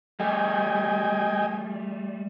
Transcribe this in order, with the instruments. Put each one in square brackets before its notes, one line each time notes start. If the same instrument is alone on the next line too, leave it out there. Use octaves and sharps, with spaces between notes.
[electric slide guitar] G3 A3 [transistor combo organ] D#5 G5 G#5